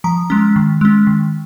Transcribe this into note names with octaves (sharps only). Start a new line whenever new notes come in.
F3 A#5
G#3 C#4
D#3
G#3 C#4
D#3